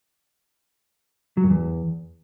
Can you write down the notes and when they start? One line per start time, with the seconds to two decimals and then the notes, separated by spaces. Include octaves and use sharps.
1.37 F#3
1.44 F#2
1.50 E2